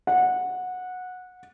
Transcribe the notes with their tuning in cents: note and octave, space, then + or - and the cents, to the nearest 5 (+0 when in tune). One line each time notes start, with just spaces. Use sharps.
F#5 -15